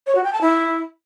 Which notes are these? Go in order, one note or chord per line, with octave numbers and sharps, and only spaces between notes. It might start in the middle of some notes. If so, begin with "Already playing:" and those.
C#5
F#4
G5
A5
E4